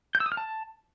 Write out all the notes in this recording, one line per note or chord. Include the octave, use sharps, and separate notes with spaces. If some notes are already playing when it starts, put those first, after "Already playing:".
G6
E6
D#6
F6
A5